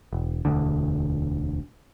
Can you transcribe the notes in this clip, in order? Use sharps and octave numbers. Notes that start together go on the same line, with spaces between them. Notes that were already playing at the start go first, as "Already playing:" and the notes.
E1
E1 D2 D3